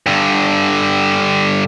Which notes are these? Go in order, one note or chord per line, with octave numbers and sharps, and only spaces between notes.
G2 D3